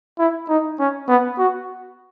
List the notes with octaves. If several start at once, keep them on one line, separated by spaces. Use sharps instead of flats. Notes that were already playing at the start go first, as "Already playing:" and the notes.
E4
D#4
C#4
B3
F#4